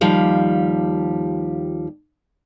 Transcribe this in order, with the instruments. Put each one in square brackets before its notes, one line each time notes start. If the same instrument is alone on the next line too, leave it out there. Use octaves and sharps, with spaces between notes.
[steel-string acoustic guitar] D#2 F3 G3 F5